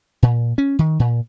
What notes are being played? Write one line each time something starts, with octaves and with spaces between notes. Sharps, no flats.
A#2
C#4
D#3
A#2